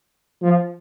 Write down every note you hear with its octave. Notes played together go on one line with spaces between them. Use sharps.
F3